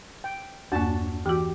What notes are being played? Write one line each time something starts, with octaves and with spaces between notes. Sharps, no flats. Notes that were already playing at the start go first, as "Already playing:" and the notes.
G5
E2 G2 A#3 D4 F#4 A5
E3 F#4 G4